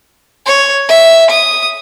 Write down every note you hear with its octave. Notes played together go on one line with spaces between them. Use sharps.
C#5
E5
D#6